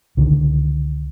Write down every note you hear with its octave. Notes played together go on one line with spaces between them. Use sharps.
C#2 D3 D#3